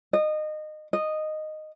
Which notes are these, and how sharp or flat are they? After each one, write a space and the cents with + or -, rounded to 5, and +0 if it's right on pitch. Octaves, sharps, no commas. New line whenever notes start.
D#5 -25
D#5 -10